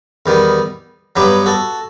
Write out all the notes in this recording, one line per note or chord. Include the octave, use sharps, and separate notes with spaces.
E2 D#3 G3 B3
G2 F#3 B3 G4 B4
F#4 A4